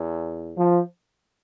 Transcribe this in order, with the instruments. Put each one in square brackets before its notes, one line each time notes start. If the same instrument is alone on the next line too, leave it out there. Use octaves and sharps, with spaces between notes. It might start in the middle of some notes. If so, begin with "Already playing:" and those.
Already playing: [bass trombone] E2
[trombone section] F3